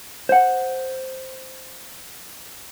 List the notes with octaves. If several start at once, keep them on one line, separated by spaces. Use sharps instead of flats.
C5 F#5